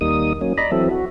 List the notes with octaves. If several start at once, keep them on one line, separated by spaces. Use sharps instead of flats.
D#2 G3 A#3 D#4 D#6
F#3 A#3 C#4
D5 D#5 A#5 B5
E3 F#3 C4 A4 E5
F#4